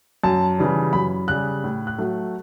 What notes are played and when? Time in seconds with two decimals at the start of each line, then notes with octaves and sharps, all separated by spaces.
0.24 F#2 A5
0.58 C#3 E3 G3
0.93 F#2 B5
1.28 C#3 G3 F#6
1.64 A2
1.87 F#6
1.98 F#3 A3